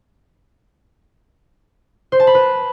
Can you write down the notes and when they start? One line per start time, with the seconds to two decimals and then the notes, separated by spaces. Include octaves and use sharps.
2.12 C5
2.20 A5
2.27 B5
2.35 B4